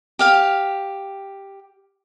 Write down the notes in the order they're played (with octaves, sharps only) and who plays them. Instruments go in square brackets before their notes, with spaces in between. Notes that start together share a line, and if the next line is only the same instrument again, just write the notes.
[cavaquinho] G4 F5 G5